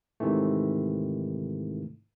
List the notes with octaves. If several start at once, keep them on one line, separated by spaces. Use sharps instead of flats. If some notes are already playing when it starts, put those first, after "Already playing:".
G#2 C3 D#3 E3 A3